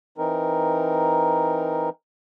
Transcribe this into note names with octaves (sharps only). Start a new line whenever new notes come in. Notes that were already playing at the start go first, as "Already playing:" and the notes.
E3 C4 D#4 A#4